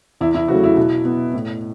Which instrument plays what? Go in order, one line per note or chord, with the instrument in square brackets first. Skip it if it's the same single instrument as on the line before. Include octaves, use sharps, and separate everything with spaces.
[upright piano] E2 E4
E4
C#3 F#3 A3 F#4
E4
B2
B3
A2